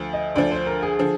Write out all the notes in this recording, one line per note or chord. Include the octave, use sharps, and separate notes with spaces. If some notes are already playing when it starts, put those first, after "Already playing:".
Already playing: D2 F3
D#5
D2 D3 F3 D5
C5
A#4
G#4
D3 F3